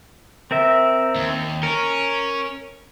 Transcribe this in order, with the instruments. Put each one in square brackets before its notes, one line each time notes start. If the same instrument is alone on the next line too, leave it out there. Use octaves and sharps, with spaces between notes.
[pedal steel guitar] C4 A#4 E5
[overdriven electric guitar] D#2
[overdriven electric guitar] C#4 [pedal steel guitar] A#4